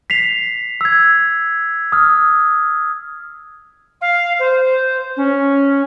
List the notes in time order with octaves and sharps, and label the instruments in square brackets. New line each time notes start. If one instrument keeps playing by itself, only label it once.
[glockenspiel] B6 C7 F7
E6 G#6
D#6 F6
[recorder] F5
C5
C#4